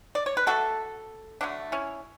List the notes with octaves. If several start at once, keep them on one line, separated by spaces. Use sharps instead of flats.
D5
C#5
B4
D3 F#3 A3 F#4 A4
D3 F#3 A3 D4
C#4 E4